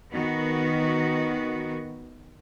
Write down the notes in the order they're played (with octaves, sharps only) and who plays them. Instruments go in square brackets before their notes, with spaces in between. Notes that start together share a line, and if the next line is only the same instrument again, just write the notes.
[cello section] D#3 B3 F#4